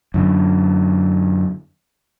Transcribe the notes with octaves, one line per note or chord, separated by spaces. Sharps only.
F#2 D3